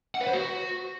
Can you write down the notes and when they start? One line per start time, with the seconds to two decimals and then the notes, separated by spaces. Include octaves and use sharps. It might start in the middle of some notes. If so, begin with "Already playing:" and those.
0.15 F#5
0.21 B4
0.27 C5
0.33 F#4